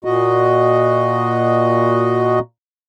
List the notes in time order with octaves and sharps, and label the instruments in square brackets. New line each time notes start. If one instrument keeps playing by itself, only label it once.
[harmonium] A#2 F#4 D#5